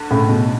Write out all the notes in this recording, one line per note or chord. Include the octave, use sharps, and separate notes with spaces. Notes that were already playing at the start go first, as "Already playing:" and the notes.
Already playing: D2 D3
A2 C#3
B2